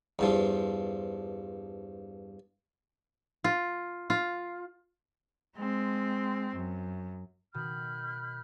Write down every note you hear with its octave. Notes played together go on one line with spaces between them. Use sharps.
E2 G2 F3
F4
F4
G#3 C4
F#2
B2 D#3 B5 F6 G6